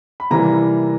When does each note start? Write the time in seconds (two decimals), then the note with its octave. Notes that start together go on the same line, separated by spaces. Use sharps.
0.20 B5
0.31 C3 E3 G3 A#3 A#5